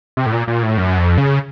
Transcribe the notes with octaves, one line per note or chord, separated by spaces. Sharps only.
C3
A2
A#2
A#2
A2
F#2
F2
C#3